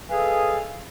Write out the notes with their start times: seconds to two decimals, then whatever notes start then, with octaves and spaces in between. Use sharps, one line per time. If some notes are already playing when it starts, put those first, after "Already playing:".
0.09 G#4 A4 B4 D#5 F5 G#5